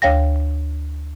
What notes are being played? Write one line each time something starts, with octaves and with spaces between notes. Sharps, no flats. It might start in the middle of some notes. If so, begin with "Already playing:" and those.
D2 C#5 F5 G5 A#6